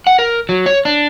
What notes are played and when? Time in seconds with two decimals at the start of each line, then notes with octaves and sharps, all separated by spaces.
0.07 F#5
0.19 A#4
0.49 F#3
0.66 C#5
0.85 D4